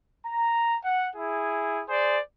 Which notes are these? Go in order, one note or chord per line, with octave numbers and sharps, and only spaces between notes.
A#5
F#5
E4 G#4
G#4 C5 D5